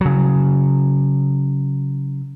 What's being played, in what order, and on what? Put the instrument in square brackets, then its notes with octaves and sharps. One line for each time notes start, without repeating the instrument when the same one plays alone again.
[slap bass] C#3 F#3